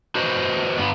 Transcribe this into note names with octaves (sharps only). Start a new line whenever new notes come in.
F#4 B4 C5 D#5
G2 B3